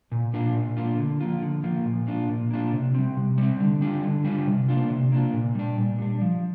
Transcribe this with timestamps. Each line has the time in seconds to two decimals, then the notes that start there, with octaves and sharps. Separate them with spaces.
0.12 A#2
0.33 A#3 D4 F4
0.55 A#2
0.77 A#3 D4 F4
0.98 D3
1.21 F3 A#3 F4
1.42 D3
1.64 F3 A#3 F4
1.85 A#2
2.07 A#3 D4 F4
2.29 A#2
2.51 A#3 D4 F4
2.72 C3
2.94 G3 C4
3.17 C3
3.38 G3 C4
3.60 D3
3.81 G3 D4 F4
4.03 D3
4.25 G3 D4 F4
4.47 C3
4.69 A#3 D4 F4
4.90 C3
5.12 A#3 D4 F4
5.34 A#2
5.55 G3 D4
5.77 A#2
5.98 G3 D4
6.21 F3